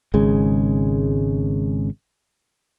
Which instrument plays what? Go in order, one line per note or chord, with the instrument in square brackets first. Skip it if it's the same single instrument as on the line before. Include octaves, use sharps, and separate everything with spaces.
[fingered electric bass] G#1 C#3 G#3